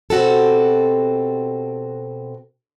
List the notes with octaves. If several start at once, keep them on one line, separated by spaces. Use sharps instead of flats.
B2 C4 F#4 G4 A4